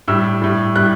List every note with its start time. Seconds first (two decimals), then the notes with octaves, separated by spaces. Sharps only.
0.08 A2 G3 E6
0.42 A2 G3
0.76 A2 G3 F#6